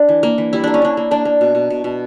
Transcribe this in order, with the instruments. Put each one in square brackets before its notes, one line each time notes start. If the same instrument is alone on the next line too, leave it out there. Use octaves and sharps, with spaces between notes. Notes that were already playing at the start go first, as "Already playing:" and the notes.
Already playing: [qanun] D4
E3
A#3
E3
G3 E4
A#3 D4
C#4
A#3 D4
A#3
A#3 D4
A#3
B2
B2
B2
B2